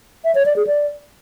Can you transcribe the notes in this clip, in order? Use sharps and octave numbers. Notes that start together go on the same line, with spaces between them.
E5
C#5
D5
G#4
D5